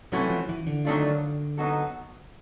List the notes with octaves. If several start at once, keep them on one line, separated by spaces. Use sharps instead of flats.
C3 E3 F#3 A3 C#4 F#4
F3
E3
D3
D#3 F#3 A3 D4 F4
F#3 B3 D#4 F#4 A4